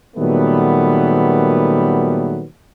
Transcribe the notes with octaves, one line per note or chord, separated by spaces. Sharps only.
A#2 D#3 F#3 G3 A3 B3